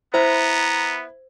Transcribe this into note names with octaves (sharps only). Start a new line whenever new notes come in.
B3 E4 C5 E5 A#5